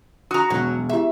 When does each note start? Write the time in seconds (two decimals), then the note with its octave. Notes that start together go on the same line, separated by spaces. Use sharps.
0.31 F#4 A#5 D#6
0.50 E1 F#3 D4
0.89 E4 G4 G#4 E5